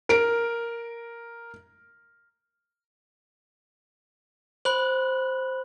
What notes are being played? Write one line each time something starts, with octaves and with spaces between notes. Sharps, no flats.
A#4 D7
C5 B5 F#6 F#7